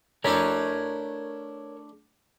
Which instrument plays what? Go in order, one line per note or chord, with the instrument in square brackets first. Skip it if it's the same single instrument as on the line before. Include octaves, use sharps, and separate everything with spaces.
[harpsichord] A3 D4 E4 [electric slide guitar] A#4 C#5 A#5